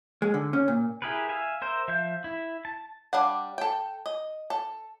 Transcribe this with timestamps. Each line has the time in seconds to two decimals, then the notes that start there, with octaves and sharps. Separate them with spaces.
0.22 G#3
0.34 D3
0.53 C#4
0.68 A#2
1.02 E4 G4 G#4 A#4 B4
1.29 E5 F5 G#5
1.62 A#4 C5 E5
1.88 F3 E5 F5 G6
2.24 E4
2.65 A5
3.13 G3 D4 F5 F#5
3.58 A4 G5
4.06 D#5
4.50 A4